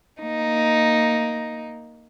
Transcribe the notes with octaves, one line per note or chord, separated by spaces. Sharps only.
A#3 D#4